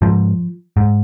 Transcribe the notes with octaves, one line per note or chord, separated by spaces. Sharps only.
G#2 F3
G#2